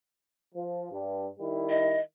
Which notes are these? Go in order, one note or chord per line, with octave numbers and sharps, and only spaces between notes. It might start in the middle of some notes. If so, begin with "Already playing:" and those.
F3
G2
D#3 G3 E4
D#5